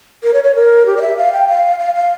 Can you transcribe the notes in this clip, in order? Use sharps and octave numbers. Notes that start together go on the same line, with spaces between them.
A#4
C#5
C#5
A#4
G4
D5
E5
F5
G5
F5
F5
F5